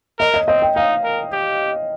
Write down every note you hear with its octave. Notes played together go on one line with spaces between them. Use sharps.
A#4 D#5
D#5
C4 D#5
G5
D#4 F5
A#4
G4